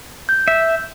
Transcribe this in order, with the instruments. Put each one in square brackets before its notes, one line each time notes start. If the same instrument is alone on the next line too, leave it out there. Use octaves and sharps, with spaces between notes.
[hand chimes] G6
[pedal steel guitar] E5